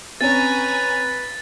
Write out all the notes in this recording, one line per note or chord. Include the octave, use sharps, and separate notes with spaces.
C4 C#4 B4 G#5 A#5 A6